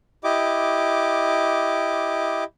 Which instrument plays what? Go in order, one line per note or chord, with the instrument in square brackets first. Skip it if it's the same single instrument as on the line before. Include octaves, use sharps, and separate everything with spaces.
[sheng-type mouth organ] E4 G4 D#5 D6